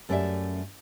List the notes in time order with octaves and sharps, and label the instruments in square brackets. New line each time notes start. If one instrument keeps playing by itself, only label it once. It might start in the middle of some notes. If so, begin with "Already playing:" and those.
[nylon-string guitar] F#2 A3 C#4 G4 D5 E5